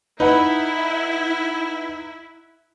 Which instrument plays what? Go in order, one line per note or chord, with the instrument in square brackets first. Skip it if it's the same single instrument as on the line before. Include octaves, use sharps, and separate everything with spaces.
[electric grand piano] D#4 [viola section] E4 [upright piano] B4 F#5 B5